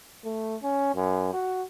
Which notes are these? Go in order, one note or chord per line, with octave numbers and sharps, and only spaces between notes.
A3
C#4
F#2
F#4